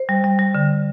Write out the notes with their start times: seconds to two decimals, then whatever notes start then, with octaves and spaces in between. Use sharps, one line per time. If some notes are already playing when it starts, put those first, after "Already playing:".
Already playing: C5
0.09 G3
0.24 G3
0.39 G3
0.55 D3